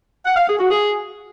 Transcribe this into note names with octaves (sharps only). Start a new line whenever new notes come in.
F#5
F5
G#4
F#4
G#4